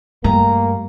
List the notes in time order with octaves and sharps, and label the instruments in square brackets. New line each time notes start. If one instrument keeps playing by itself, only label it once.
[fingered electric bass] G2 G3 [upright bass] A3 [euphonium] A#3 [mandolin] A#5